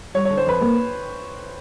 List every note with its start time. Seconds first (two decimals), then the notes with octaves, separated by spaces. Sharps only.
0.14 G3 C#5
0.25 D3 C#5
0.37 C5
0.45 F2 B4
0.61 A#3